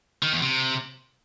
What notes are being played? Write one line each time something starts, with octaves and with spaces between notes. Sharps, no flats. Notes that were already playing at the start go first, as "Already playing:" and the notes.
D#3
E2
C3